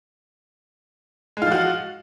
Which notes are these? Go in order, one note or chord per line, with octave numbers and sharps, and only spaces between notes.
F3 G#3 F4 F#4